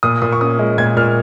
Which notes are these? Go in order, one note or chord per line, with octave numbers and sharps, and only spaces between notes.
A#2 D#6
A#2 D#6
C#6
C#4 D#6
G#3
A#2 G#6
A#2 F6